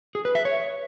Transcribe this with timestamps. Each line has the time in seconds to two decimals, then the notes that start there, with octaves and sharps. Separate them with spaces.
0.15 G#4
0.25 B4
0.35 E5
0.45 C#5